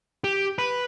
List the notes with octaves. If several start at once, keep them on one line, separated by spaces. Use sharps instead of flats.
G4
B4